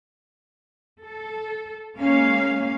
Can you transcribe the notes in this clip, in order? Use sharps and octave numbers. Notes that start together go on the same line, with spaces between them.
A4
G#3 A#3 C#4 F5